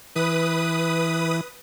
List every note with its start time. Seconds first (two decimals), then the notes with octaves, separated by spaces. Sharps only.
0.16 E3 B4 D#6